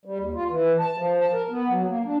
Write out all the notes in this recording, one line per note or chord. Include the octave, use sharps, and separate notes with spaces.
G3
D#2
F4
E3
A5
F3
A5
A#4
B3
F#3
A#3
D4